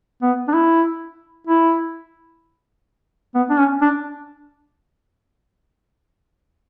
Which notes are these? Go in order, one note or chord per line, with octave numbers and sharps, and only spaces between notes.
B3
D4
E4
E4
B3
D4
C#4
D4